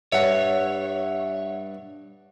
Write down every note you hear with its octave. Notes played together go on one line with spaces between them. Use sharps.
G2 C#5 E5 F#5